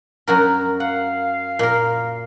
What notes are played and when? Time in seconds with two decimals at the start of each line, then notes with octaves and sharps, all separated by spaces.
0.27 F#2 F#4 A#4
0.80 F5 F#5
1.59 A#2 A#4